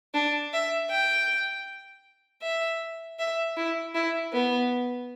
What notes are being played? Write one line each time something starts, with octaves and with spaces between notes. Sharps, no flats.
D4
E5
G5
E5
E5
E4
E4
B3